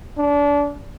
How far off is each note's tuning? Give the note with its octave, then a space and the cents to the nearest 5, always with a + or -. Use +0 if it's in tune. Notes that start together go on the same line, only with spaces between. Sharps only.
D4 -25